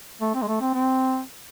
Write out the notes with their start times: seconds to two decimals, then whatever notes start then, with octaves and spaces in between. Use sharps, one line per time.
0.21 A3
0.34 C4
0.42 G#3
0.47 A3
0.61 C4
0.74 C4